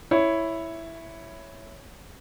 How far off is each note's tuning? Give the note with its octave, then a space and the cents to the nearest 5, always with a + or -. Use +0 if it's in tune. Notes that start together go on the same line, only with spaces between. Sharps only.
E4 +0 C#5 +0